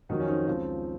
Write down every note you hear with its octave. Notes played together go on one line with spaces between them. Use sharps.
F2 D#3 F#3 D#4 F#4
C#4
C4 D#4
C#2 C#3 F3 C4